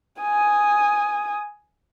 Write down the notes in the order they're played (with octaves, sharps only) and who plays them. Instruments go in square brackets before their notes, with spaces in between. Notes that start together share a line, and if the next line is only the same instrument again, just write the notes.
[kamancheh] G#5 D#6